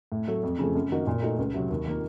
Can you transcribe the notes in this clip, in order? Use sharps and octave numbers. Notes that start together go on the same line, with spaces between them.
A2
F#3 A3
F2
C#3 F3 A3
F#2
D#3 A#3 D#4 F#4
A#2
A3 D#4 F#4
C#2
C3 F#3
D#2
D#3 A#3 F4